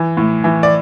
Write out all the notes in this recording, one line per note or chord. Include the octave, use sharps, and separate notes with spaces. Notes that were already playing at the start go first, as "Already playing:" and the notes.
Already playing: E3
A2
E3
D5